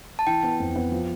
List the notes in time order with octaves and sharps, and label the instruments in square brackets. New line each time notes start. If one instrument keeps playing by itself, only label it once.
[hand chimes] A5
[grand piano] E3 [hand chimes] G5
[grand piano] B3
F2
B3
F3